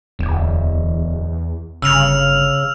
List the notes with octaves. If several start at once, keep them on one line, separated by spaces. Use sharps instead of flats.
D1 E2
G1 C#3 E6 F6 F7